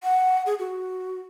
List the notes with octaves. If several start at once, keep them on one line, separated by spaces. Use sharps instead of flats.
F#5
G#4
F#4